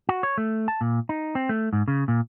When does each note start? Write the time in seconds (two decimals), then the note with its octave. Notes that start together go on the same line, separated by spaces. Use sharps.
0.09 F#4
0.23 C#5
0.38 A3
0.68 A5
0.81 A#2
1.09 D#4
1.35 C4
1.49 A3
1.73 G#2
1.88 C#3
2.08 A#2